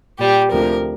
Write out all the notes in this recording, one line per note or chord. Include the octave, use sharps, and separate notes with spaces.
A#2 G3 G4
D2 C3 F3 A#4